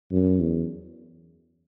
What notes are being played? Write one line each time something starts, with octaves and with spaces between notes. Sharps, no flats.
F#2
E2